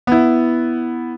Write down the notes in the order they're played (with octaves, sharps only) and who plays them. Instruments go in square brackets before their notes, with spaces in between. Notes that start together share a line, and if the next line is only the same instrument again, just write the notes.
[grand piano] B3 E4